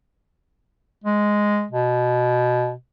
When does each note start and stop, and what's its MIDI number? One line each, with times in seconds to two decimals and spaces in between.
1.04 1.65 56
1.71 2.72 47